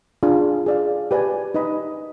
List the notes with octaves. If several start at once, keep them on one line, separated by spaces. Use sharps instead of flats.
D4 F4 G#4
G#4 D5 F5
G4 B4 D5 G#5
D#4 B4 D#5 B5